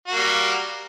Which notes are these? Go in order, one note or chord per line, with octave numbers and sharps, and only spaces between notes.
G3 A#3 F#4